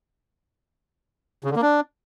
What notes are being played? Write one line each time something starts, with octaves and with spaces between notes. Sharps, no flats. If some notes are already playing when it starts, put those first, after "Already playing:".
C#3
D3
A#3
D4